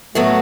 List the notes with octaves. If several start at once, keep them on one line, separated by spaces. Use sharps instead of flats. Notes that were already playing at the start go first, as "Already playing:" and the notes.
A2 F#3 A3 B3 F#4